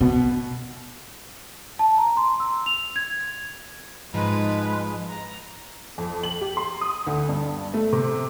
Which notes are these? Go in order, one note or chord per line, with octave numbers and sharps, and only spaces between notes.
B2
A5
A#5
C6
E6
F7
G#6
G#2 F3 G#3 D#4 B4
A#5
F2
F#7
G4
C6
D#6
D2
G2
A3
C3